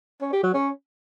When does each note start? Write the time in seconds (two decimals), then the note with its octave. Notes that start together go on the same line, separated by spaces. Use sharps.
0.22 C#4
0.33 G4
0.43 F#3
0.54 C#4